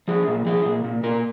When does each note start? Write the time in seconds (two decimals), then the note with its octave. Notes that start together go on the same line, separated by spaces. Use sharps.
0.08 F3 G#4
0.28 A#2
0.46 F3 G#4
0.65 A#2
0.84 A#2
1.03 A#2 A#4